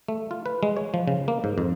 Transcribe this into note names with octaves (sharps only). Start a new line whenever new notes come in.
A3
F4
B4
G#3
C#5
F3
C#3
A#3
G#2
F2